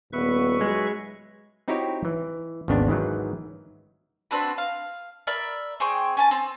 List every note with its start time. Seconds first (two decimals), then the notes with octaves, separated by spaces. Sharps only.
0.13 D#1 B3 B4 E5 C#6
0.61 F#3 G#3
1.68 C4 D#4 E4 F#4 G4 C#5
2.05 E3
2.68 G#1 D#2 C#3 B3 D4
2.88 G#2 D#3 E3 F#3
4.31 C4 D4 F#4 B4
4.58 F5
5.27 A#4 D5 E5 B5
5.80 C4 G#4 G5 C#6
6.17 C#4 G#5 A5
6.31 C4